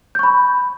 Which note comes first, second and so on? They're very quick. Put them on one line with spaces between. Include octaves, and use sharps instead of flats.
G6 C#6 B5